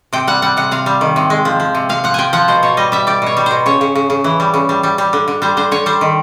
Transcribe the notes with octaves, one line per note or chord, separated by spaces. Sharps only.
C3 G5
G3 F#5
G3 F#5
C3 F#5
C3 F5
G3
D#3
C3
G#3
F3
F3
C3
C3 F5
F3 F#5
F3 G5 G#5
F3 F#5
B2 C5
B2 C#5
G3 D#5
G3 E5
G3 D5
B2 C#5
G3
B2 C5
C#3 C#5
C#3
C#3
C#3
E3
G3
C#3
G3
G3
G3
D3
D3
G3 C5
D3 C5
D3 C#5
G3 C5
D#3